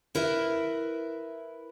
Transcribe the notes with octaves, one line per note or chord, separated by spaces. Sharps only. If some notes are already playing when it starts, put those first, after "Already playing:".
E4 A#4 B4 E5